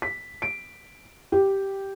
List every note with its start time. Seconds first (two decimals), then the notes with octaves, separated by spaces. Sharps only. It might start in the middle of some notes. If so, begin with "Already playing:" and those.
0.02 B6
0.42 D7
1.32 G4